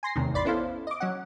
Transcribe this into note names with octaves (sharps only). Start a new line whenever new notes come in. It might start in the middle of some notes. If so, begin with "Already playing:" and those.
G#5 C6 A#6 C7
E2 A2 C3 D#3
A1 E2 D5 B5 C6 A6
B3 C#4 E4 A4 C5 F5
D#5 D6
F#3 C#4 F#5